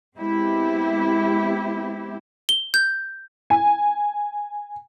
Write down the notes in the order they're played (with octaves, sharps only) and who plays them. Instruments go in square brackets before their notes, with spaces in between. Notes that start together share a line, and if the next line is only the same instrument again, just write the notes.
[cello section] G#3 B3 C4 E4 G4
[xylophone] G7
G6
[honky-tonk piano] G#5